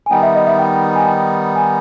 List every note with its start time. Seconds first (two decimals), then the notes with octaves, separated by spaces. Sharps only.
0.06 G#5
0.10 D#3 G3 B3 D#4 G5
0.22 E5
0.35 D#5
0.47 E5
0.59 G5
0.96 G#5
1.07 G5
1.56 G#5